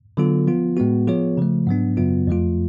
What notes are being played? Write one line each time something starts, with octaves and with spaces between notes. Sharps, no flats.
D3 F#3 B3 F4 A4
F3 B3 F4
A2 G#3 B3 F#4
F3 B3 F4 G#4 C#5
C#3 F3 A3
G#2 F#3 B3 D4
F#2 C#3 F#3 B3 F4
F2 F3 A3 F4